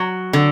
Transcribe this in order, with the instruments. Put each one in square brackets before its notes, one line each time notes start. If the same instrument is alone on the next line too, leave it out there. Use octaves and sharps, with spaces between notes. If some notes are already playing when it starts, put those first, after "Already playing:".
Already playing: [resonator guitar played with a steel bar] F#3
D3